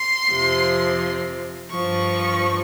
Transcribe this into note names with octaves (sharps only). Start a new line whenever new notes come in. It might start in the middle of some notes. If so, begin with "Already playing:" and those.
Already playing: C6
F2 C3 F3
G2 F3 C#6